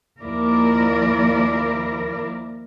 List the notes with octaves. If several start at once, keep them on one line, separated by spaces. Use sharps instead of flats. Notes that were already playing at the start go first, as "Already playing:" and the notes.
D#2 F3 A#3 E4 A#4 D5